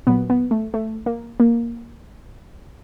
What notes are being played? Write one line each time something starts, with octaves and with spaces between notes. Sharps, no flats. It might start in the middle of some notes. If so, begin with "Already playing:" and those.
A#2 F#3 B3
B3
A3
A3
A#3
A#3